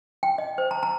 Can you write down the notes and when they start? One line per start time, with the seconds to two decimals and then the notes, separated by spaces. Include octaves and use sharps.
0.23 G5
0.38 D#5
0.58 C5
0.71 A#5
0.83 A#5